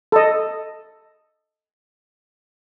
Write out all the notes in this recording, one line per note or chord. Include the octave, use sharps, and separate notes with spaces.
A4 D#5